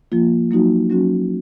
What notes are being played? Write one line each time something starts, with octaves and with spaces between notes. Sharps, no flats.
F3 A#3 F4
F#3 A#3 D#4 F#4
F#3 C#4 F#4